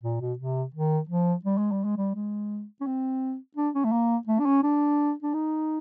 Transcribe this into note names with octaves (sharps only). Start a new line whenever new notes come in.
A#2
B2
C3
D#3
F3
G3
G#3
G3
G#3
G3
G#3
C#4
C4
D4
C#4
A3
A#3
A3
D4
C#4
D4
D4
D#4